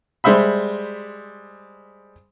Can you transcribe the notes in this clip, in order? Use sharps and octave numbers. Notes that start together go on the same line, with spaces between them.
G3 G#3 C5 E5 B5